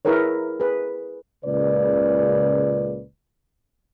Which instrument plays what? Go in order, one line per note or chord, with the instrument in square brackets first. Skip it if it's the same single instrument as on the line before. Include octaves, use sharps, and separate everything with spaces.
[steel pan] E4 G#4 A#4 B4 C#5
G#4 B4
[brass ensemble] C#2 A#2 C#3 B4 D5